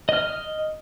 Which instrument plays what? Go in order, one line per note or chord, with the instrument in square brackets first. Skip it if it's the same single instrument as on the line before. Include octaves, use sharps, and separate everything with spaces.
[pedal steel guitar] D#5 F6